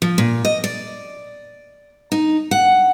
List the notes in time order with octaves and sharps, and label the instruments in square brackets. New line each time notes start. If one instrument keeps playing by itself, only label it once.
[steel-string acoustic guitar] F3
A#2
D#5
D5
D#4
F#5